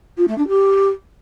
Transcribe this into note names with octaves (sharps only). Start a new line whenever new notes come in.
F4
A3
D4
G4